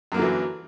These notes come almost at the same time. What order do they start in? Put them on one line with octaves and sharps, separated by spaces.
F#2 A#3 D3 F#3 E3